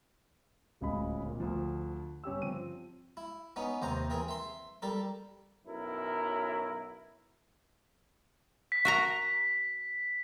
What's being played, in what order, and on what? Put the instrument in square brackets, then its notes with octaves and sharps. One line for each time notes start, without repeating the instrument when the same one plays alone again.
[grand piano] D1 C#2 C#3 G#3 B5
A#2
D2 F3
G2 C#4 G4 E6
F3 C4 D#7
[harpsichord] E4
B3 C#4 D#4
D#2 C3 C5 A#5
E3 C4 G#4 A#4
E5 C6
G3 A4 A#4
[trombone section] B1 F#2 E4 A#4
[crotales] B6
[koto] F#4 A#4 A#5